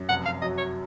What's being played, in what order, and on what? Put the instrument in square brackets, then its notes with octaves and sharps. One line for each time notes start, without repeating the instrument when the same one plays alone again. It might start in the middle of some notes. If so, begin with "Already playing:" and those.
Already playing: [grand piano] F#2
[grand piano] F1 [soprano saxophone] F#5
[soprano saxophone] F5
[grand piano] F#3 [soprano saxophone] D#5
[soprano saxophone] C#5